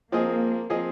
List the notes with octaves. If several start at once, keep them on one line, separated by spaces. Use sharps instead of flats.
F3 A#3 C4 G#4 D#5
F3 C4 G#4 D#5